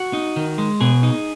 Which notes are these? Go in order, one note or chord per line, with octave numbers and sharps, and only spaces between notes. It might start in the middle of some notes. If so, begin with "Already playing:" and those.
Already playing: F#4
D#4
D#3
G#3
B2 G#4
D#4